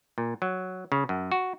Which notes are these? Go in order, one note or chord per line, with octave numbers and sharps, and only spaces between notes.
A#2
F#3
C#3
F#2
F#4